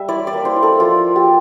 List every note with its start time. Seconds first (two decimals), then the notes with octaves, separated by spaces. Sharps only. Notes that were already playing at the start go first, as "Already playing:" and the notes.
Already playing: G3 E5
0.08 E4 D5
0.27 D5
0.33 A#3
0.45 C5
0.56 E4
0.63 A4
0.80 F3 F4
1.04 A#3
1.16 G4